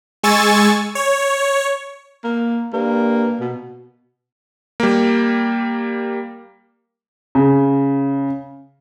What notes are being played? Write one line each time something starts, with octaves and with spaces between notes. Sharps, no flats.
G#3 G#5 C#6 E6 A6
C#5
A#3
G2 A#3
B2
G3 A#3
C#3